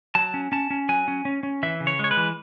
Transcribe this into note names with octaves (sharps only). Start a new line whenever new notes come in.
F#3 A5
C#4
C#4 A5
C#4
F#3 G#5
C#4
C#4
C#4
E3 E5
C#3
C#5
G#3 C#5
B4
E3